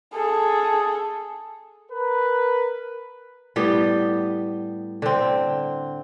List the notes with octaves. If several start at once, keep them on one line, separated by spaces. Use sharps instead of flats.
G#4 A4
A#4 B4
A2 G3 B3 G4
D3 C4